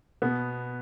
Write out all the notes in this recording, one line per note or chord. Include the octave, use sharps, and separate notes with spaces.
B2 B3